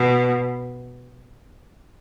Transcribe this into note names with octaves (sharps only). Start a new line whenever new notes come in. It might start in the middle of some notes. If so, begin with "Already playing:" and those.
Already playing: B2